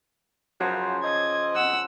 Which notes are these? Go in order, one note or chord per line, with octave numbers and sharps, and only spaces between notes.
C#3 F3 F#3 C5
D#5 G#6
F#5 E6